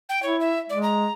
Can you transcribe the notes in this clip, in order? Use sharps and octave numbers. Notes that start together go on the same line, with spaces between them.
G5
E4 C#5
E5
G#3 D5
A#5